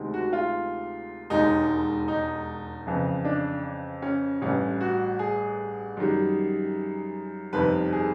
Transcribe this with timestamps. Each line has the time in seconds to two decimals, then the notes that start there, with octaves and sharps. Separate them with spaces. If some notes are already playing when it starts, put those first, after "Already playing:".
Already playing: D2 C3 D#3 G#3
0.14 F#4
0.33 F4
1.30 E1 D#2 D#3 G#3 D#4
2.08 D#4
2.87 F2 C#3 E3
3.25 D4
4.02 C#4
4.41 A1 G2 E3 A3 C#4
4.81 F#4
5.19 G#4
5.97 F#2 D#3 G3
7.53 G1 F2 C3 D#3 B4
7.93 G#4